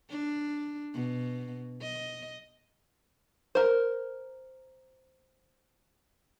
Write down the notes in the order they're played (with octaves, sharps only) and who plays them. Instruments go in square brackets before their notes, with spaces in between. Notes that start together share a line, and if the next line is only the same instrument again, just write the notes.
[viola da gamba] D4
B2
D#5
[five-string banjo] A#4 C5